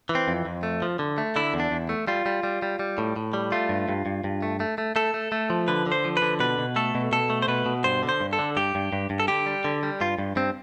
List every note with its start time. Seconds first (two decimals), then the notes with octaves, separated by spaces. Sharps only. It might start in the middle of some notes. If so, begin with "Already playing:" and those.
0.09 E3
0.15 C4
0.28 F2
0.45 F2
0.63 A3
0.82 F3
0.99 D3
1.18 A3
1.36 D3 E4
1.54 E2
1.60 D4
1.71 E2
1.89 A3
2.07 G3 F4
2.26 G3
2.43 G3
2.62 G3
2.79 G3
2.98 A2
3.16 A2
3.33 G3
3.52 A3 F4
3.69 G2
3.89 G2
4.06 G2
4.24 G2
4.42 A3
4.60 A3
4.78 A3
4.96 A3 A4
5.14 A3
5.32 A3
5.50 F3
5.68 D3 B4
5.86 D3
5.92 C5
6.05 F3
6.17 B4
6.22 D3
6.40 B2 B4
6.59 B2
6.76 A3 A4
6.95 B2
7.12 B2 A4
7.30 A3
7.42 C5
7.48 B2 B4
7.66 B2
7.84 G2 C5
8.03 D3
8.09 C5
8.21 G2
8.33 A4
8.39 D3
8.56 G2 G4
8.75 G2
8.93 G2
9.10 G2
9.20 A4
9.28 D3 G4
9.46 G3
9.65 D3
9.83 G3
10.01 G2 F4
10.18 G2
10.36 G2 C4